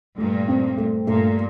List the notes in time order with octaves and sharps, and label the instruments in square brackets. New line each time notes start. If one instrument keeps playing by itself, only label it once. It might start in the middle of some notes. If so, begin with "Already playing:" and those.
[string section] G2 A#2 [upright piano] A3
[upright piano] C4
A3
[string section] G2 A#2 [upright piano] A3